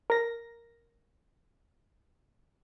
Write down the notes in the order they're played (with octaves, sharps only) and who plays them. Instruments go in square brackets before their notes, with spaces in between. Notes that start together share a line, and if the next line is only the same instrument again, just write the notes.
[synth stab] A#4 A#6